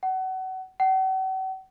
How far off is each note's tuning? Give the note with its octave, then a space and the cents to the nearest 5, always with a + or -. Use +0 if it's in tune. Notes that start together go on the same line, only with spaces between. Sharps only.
F#5 +30
F#5 +45